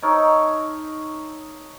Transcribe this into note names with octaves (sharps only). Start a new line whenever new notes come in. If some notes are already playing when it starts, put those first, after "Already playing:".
D#4 A4 A#4 C#5